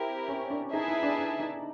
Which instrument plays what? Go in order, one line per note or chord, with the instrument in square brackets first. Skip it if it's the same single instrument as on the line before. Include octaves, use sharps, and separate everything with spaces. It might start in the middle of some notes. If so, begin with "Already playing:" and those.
Already playing: [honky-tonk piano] C4 [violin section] E4 G4 A#4
[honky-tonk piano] C#4
D4
[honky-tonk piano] D#4 [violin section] E4 G#4 B4 E5 A5
[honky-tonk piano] D#4
D4
D4
D#4